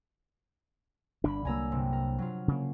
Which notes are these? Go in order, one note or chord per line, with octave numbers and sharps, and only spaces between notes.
G1 D3 D4 B5
C2 F#3 A#3 G#5 A#5 E6
G1 C3
A#4
F#3 F4
C#3 A#3